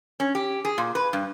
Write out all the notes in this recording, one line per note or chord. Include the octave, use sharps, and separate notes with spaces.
C#4
G4
G#4
A#2
B4
G2